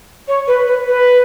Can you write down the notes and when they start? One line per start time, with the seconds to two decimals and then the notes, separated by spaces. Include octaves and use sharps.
0.28 C#5
0.48 B4
0.67 B4
0.88 B4